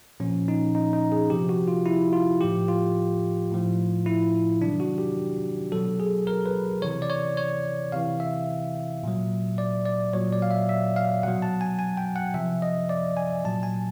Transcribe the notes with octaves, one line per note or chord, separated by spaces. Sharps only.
A#2 F3 C#4
D#4
D#4
D#4
G#4
C3 F3 G4
F#4
F4
E4
F4
A2 F3 G4
F4
A2 F3
E4
C3 D#3 F#3 D4
F#4
G4
B2 F#3 A4
G#4
A#4
B4
C3 E3 C#5
D5
C#5
C#5
C3 E3 F5
E5
A#2 F#3
D5
D5
A#2 F#3 C#5
D5
F5
E5
E5
F5
B2 F#3 F#5
A5
G#5
G#5
G5
F#5
C3 F3 E5
D#5
D5
G#5
A#2 F#3 A5
G#5